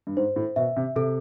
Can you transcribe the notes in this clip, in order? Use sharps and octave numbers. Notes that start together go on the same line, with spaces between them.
G2
G#2 C5
A2
B2 E5
C3
C3 A4